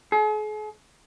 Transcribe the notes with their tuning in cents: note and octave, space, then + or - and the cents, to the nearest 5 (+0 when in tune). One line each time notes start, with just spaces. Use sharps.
G#4 +45